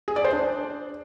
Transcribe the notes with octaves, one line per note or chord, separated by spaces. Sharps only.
G#4
D5
C5
D4